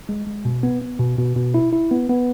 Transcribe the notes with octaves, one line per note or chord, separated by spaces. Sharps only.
G#3
G#3
B2
B3
B3
B2
B2
B2
E4
E4
B3
B3